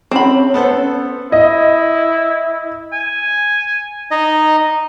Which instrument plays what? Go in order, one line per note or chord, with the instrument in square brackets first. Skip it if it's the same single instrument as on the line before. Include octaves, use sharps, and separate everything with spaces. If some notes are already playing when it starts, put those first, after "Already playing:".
[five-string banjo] C4 B5 [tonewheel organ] C#4
[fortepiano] B3 A4 C5
[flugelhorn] E4 [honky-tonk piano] D#5
[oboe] G#5
[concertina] D#4 D#5